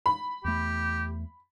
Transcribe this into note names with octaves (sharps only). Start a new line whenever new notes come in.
B5
E2 A3 G4